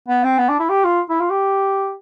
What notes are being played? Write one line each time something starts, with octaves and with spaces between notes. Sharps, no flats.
B3
C4
B3
D4
E4
G4
F4
E4
F4
G4